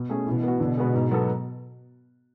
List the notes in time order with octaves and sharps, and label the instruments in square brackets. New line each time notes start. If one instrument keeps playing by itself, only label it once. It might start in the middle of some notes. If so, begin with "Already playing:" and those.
Already playing: [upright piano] B2
A3 C#4 G#4
[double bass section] B2 [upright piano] E3
[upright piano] B3 F#4
[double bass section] B2 [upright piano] D3
[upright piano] G#3 B3 F#4 B4
G#2
F#3 B3 F#4 A4